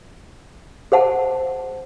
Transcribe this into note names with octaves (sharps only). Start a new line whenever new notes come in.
G#4 C5 F#5 A5